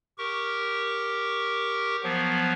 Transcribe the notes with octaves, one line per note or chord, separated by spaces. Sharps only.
G4 A#4 C#6
F3 F#3 B3